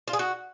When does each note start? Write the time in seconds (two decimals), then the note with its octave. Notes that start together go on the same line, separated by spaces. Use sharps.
0.08 F4
0.13 G#4
0.19 F#4